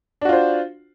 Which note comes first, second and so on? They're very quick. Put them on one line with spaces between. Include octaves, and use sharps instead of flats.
D4 F#4 F4 C5